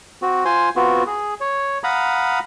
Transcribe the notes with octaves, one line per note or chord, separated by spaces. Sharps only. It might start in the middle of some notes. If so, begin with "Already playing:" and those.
C4 F#4
F4 C5 G#5 C6
B3 C4 F4 F#4
G#4
C#5
F5 F#5 A#5 B5 D#6